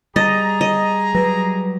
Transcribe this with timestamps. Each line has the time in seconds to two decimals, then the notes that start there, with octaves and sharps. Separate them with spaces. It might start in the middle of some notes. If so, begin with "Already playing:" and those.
0.16 G3 G#4 D#5 A#5 A6
0.61 D#5
1.15 F#3 G3 B4 A#6